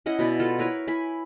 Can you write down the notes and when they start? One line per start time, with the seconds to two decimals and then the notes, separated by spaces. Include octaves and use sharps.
0.06 C#4 E4 D#5 F#5
0.19 B2 E4 D5
0.40 F4 A4
0.59 E4 A#4 B4 C#5
0.87 E4 G#5 B5